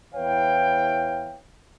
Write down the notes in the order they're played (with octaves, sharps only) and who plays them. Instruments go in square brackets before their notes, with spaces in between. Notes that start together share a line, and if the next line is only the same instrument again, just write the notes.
[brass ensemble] E2 E4 B4 C#5 F5 G5